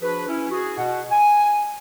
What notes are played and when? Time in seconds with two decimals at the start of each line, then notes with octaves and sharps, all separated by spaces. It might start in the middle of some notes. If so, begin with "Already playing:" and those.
0.01 F3 D4 F#4 G#4 B4
0.27 C#4 E4
0.51 F#4 G#4
0.77 B2 F#5
1.11 G#5